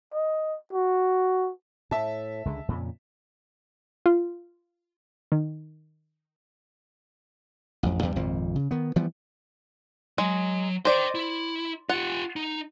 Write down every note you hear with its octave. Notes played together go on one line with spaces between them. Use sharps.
D#5
F#4
A2 E5 A5
C#2 D3 G#3
F2 A#2 C#3
F4
D#3
A1 F2
E2 G2 G3
G#1 F2 A#2 F3
C#3
D#3 B3
E3 F3 G3 B3
F#3 G#3
C5 D5 D#5 G5
E4
F4 G4 F#5
D#4